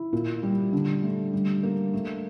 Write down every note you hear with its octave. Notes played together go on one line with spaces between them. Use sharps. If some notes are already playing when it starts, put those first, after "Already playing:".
Already playing: E4
A#2
G3
D3
A3
G3
A#3
A3